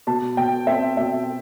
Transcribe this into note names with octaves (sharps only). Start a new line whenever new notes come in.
B2 A5
B2 G5
C4 E5
B2 E5